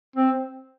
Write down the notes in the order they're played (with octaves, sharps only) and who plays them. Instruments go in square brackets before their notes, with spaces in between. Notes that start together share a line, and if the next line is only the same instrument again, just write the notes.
[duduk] C4